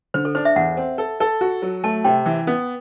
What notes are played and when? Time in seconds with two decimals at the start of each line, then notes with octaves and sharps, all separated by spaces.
0.14 D3 C5
0.25 A4
0.35 D4 C5
0.45 E5
0.56 E2 F#5
0.77 C4
0.98 A4
1.20 A4
1.41 F#4
1.62 F#3
1.83 A3 A5
2.04 C3 G5
2.26 E3
2.47 B3